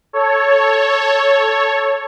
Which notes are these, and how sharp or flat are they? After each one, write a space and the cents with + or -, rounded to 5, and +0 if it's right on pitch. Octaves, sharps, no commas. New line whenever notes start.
A4 +0 C#5 +0